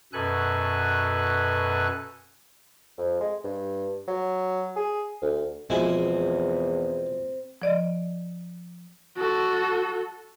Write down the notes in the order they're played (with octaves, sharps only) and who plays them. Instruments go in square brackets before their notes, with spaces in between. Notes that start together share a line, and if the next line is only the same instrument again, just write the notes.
[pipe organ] F#2 B2 A4 B4 G#5 F#6
[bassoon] F2
G#3
G2
F#3
G#4
D2
[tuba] E2 [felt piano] B2 F3 [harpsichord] G#3 E4 G#5 [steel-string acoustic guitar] C4
[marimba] F3 D5 D#5
[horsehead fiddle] F#4 A4